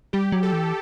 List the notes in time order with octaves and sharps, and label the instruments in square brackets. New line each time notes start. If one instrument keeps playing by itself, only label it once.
[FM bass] G3 [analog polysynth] G4
[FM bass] F#3
[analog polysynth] A4
[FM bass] E3